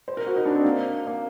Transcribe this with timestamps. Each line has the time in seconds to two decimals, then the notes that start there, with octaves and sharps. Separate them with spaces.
0.08 C5
0.17 A#4
0.27 F#4
0.36 D#4
0.46 D4
0.55 C4
0.64 A#3
1.07 A#3